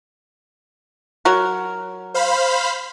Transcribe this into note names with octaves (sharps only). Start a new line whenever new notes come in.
F#3 F#4 A#4
C5 F5 B5